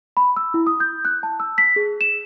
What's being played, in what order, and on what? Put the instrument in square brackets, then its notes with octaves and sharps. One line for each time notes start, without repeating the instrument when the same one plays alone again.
[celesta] B5
E6
E4
D#6
G6
F#6
A5
E6
B6
G#4
E7